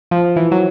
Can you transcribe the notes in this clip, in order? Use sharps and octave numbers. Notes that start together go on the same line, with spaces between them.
F3
E3
F#3